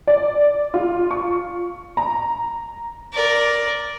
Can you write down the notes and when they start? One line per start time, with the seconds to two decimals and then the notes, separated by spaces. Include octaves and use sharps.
0.07 D5
0.74 F4
1.11 C#6
1.97 A#5
3.14 A#4 D5